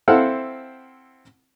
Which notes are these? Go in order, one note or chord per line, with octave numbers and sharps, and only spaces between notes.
C4 E4 A4 C5 F5 F#5